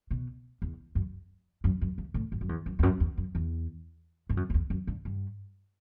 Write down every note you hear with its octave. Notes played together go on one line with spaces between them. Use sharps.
B2
E2
F#2
F#2
F#2
G2
A2
G2
F#2
E2
F#2
E2
F#2
E2
F#2
E2
G2
F#2
F#2
E2
F#2
G2
G2